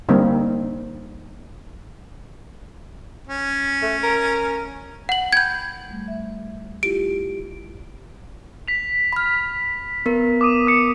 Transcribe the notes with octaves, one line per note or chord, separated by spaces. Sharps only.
D3 G3 A#3 C4 D#4
C#4
A3
A#4
F#5 F#7
G5 B5 G6 G#6
G3 A3
E5
E4 F4 G4 D7
B6 F7
B5 F6
B3 A#4
D6 D#6 D#7
D#6 C#7